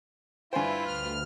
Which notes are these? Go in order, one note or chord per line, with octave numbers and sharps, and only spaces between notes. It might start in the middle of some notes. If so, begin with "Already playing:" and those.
G2 E4 F4 B4 C5 G5 G#5
D2 F6